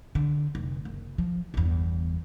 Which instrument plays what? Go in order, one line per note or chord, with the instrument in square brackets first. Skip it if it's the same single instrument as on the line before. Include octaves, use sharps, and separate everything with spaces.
[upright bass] D3
F1
F#1
F3
G1 E2